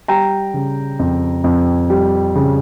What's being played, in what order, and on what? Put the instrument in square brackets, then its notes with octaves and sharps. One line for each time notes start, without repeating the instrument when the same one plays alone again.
[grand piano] G3 G5 A#5
C#3
F2
F2
G3
C#3